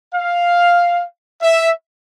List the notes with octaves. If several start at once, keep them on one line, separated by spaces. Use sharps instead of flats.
F5
E5